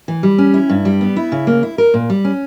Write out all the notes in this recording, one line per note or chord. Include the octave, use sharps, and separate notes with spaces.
E3
G3
C#4
E4
G2
G3
B3
E4
C#3
A#3
E4
A#4
A#2
G3
C#4